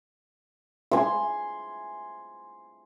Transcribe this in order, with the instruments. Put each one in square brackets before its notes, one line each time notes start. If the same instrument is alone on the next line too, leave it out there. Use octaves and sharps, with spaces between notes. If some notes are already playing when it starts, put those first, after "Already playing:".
[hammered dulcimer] G#5 C6